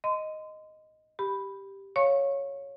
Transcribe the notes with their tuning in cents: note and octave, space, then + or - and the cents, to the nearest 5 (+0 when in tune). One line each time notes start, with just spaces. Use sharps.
D#5 +0 C6 -30
G4 +0 B5 +0
C#5 +0 F5 +5 C#6 -25